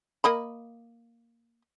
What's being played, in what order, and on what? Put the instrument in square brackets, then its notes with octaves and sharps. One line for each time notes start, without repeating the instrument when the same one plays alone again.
[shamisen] A#3 D#5 B5